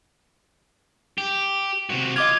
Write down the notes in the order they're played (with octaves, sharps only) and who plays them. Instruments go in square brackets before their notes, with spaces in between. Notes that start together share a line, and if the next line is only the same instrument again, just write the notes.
[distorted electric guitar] G4
C3 F#4
[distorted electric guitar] F4 [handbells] D#5 D6 G#6